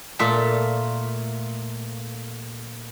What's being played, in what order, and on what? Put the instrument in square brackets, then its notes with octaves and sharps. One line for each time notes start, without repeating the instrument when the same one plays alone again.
[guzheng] A#2 A3 F4 D5 E5 A5